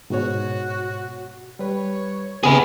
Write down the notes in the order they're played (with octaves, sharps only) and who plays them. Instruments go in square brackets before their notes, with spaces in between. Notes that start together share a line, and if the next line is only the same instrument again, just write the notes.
[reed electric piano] G#2 B2 C#5 [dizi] F#4
[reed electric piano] G3 B4 [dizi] C#5
[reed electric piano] C#3 B3 [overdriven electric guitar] G#4 B4